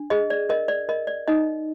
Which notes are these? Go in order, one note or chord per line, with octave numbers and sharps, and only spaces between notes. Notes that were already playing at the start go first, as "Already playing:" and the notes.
Already playing: D4
G#4 D#5
D5
A#4 D#5
D5
A#4 D#5
D5
D#4 D#5